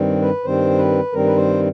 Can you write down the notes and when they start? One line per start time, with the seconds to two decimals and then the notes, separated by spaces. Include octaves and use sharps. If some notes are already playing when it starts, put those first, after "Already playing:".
Already playing: G2 D#3 G3 C4
0.22 B4
0.44 G2 D#3 G3 C4 C5
0.78 B4
1.13 G2 D#3 G3 C4 A#4
1.26 B4
1.36 C5